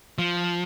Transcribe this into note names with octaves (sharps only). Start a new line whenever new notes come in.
F3